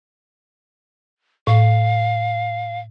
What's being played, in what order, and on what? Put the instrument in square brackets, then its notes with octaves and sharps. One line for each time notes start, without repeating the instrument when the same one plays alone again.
[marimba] A2 [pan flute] F5